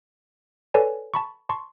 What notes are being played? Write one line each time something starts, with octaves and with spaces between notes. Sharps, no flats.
A4 B4 C#5 D5 G#5
A5 B5 C#6
A5 C6 C#6